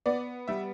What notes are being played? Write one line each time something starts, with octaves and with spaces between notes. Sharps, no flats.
B3 D5
G3 E5